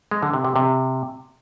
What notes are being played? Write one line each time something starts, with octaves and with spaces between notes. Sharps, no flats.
G#3
D3
C3
C3
C3